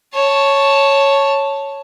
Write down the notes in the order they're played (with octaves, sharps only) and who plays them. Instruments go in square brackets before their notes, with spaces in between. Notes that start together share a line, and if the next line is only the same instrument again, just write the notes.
[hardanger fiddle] C#5 A5